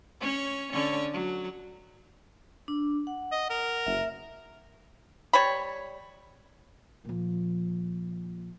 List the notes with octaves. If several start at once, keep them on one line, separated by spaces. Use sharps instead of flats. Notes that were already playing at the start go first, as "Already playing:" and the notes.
C#4 C#5
D3 C#4 C#5
F#3
D4
F#5
D#5
A#4
F#1 E5
G3 C#5 B5
A#2 F3